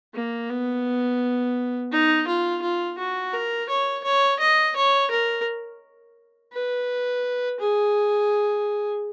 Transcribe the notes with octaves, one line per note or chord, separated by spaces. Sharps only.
A#3
B3
D#4
F4
F4
F#4
A#4
C#5
C#5
D#5
C#5
A#4
B4
G#4